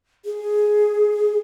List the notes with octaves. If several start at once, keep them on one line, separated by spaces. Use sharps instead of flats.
G#4